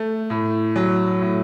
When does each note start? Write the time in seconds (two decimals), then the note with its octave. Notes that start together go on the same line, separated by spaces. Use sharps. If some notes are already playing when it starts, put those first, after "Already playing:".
Already playing: A3
0.30 A2
0.76 F#3
1.21 A2